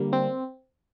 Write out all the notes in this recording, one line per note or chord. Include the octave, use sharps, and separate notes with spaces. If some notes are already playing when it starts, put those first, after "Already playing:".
Already playing: D3 G3 A#3
C4